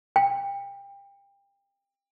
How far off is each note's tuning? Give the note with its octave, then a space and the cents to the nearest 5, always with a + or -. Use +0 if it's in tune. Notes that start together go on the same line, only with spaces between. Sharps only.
G5 +25